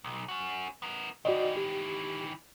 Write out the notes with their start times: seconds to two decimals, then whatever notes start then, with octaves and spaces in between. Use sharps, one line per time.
0.04 B1
0.28 C#4 F#4
0.82 B3 A#4
1.25 D#3 E3 F#4 D5 D#5
1.57 G4